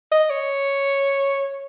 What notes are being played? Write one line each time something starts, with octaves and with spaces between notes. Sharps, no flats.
D#5
C#5